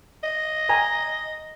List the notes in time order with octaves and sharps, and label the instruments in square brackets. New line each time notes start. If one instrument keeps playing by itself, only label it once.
[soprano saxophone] D#5
[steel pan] G5 G#5 A#5